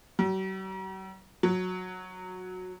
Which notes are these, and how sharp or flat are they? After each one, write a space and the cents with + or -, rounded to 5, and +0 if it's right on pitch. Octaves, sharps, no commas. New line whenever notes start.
F#3 +45
F#3 -10